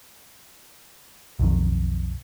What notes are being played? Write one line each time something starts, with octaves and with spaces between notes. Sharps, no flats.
B1 F2 D#3